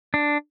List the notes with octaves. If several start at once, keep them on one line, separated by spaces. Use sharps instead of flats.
D4